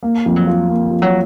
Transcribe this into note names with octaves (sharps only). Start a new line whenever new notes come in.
A#3
F2 A3
F#3
F4
A#3
F3
F2
F#3